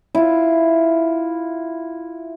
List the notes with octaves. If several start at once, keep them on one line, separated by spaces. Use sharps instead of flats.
E4 F4